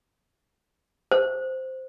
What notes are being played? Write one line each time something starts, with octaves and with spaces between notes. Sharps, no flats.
C5